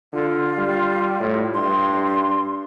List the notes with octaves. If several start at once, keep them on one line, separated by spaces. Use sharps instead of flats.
D3 F4
G3
A2
G2 C6